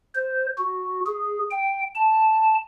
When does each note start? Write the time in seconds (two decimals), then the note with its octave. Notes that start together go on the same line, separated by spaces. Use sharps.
0.15 C5
0.58 F#4
1.06 G#4
1.51 G5
1.95 A5